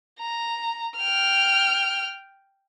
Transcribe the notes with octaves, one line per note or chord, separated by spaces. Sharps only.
A#5
G5 F6